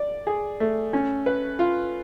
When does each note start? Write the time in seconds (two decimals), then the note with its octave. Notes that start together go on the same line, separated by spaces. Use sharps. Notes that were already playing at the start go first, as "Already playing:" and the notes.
Already playing: D5
0.27 G#4
0.60 A3
0.93 C#4
1.26 B4
1.59 F4